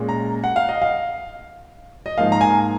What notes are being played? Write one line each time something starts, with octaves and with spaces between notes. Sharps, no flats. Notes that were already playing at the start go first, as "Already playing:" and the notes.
Already playing: A#2 G#3 C#4
A#5
F#5
F5
D#5
F5
D#5
G#2 F3 A#3 F5
A#5
G#5